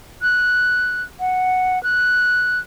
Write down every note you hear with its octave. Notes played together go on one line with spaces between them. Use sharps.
F#6
F#5
F#6